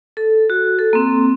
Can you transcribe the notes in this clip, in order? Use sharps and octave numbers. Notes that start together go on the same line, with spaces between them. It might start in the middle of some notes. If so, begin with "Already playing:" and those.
A4
F#4
A4
A#3 C4